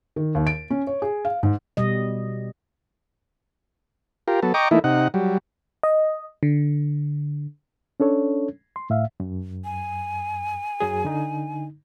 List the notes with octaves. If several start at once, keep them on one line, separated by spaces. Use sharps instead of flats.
D#3
D#2
D7
C#4
C#5
G#4
F5
G#2
B2 G3 D#5
F4 G4 A#4
F#3 B3 A4
D#5 G5 A#5 C#6 D6
E3 A3 A#3 D#4 E4
C3 D#4 F#5
F#3 G3
D#5
D3
C#4 D4 A4 C#5
C6
A2 E5 F5
F#2
G#5
F#2 F#3 G#4
D3 D#4